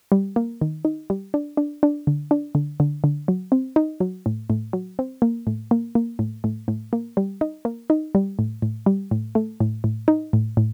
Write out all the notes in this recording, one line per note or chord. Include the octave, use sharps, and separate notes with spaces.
G3
A#3
D#3
D#4
G3
D4
D4
D4
D3
D4
D3
D3
D3
F#3
C4
D#4
F#3
A2
A2
F#3
C4
A#3
A2
A#3
A#3
A2
A2
A2
A#3
G3
D#4
A#3
D#4
G3
A2
A2
G3
A2
A3
A2
A2
D#4
A2
A2